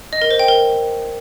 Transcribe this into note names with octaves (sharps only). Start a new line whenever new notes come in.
D#5
A#4
C5
G5
A#4